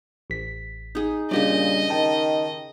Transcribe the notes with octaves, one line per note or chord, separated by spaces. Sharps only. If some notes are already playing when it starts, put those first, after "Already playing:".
A1 B6
D#4 G#4
A#2 C#3 G3 D4 G4 D5 D#5
D#3 G5 A5